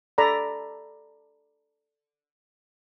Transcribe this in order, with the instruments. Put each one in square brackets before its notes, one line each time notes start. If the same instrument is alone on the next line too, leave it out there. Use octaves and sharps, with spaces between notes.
[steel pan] A4 D5 A#5 B5